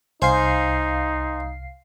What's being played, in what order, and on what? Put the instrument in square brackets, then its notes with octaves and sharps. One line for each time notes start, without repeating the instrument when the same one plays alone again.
[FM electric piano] C2 F5 C7 [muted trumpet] D#4 [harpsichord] C5 G#5